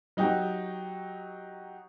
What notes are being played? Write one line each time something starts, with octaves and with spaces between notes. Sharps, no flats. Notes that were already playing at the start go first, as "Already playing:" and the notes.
F#3 D#4 F#4 G4